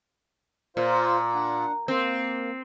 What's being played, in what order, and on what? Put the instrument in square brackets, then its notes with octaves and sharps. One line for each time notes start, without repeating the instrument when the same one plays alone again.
[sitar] A#2 [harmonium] F4 C5
[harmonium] D4 F#5
[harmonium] A#3 [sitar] C4